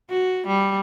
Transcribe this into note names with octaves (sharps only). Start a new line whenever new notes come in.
F#4
G3